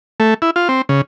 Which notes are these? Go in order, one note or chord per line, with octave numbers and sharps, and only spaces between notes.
A3
E4
F4
C4
C#3